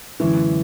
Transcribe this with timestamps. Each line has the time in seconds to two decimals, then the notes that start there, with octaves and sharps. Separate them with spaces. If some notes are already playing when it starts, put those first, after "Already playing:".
0.20 F#2 D3 E3 G#3 C#4 E4